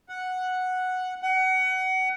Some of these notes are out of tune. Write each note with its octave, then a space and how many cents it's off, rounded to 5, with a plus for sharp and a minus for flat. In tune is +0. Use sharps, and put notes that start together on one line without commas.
F#5 -5
F#5 +25